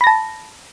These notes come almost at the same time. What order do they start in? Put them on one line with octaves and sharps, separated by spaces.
B5 A#6 A5